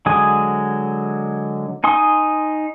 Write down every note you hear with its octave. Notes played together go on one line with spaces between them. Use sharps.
D3 F#3 G#3 G#5 D#6
D#4 G#5 C6 D#6